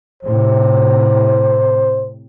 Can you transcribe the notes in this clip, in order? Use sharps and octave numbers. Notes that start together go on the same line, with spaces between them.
A2 C3 C5